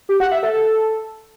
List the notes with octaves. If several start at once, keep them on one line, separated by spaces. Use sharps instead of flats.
G4
F#5
E5
A4